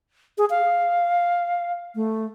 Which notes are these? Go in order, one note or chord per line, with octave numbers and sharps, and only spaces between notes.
G#4
F5
A3